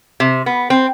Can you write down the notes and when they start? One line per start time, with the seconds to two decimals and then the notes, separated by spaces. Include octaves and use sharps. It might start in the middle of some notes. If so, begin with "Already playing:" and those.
0.20 C3
0.46 B3
0.70 C4